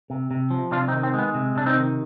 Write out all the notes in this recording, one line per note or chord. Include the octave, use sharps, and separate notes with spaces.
C3
C3
F3
C3 D4 F4
C4 D#4
D#3
C4
G#3 B3
C3
C3 D4
C4 D#4
D#3